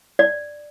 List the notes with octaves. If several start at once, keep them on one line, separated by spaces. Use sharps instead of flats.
D5